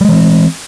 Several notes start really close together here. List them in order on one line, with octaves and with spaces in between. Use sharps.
G3 G#3 E3 C4